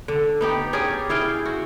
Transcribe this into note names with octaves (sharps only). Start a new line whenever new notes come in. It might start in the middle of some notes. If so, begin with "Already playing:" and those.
D3
B3 D#4 G4
C#4 G4 G#4 D5
E4 G#4 F5 G5
F#4